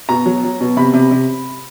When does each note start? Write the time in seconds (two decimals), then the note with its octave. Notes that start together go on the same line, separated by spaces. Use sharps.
0.09 B2 A#5
0.26 F#3
0.44 F#3
0.61 B2
0.77 C3 B5
0.93 C3
1.11 C3